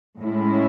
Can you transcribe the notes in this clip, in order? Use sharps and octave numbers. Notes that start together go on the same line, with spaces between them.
A2 G#3 C#4 E4